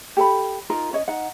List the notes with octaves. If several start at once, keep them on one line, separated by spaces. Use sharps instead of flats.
G4 A4 A5 B5
D#4 F4 A#4
C#4 C#5 D#5
D#4 F#5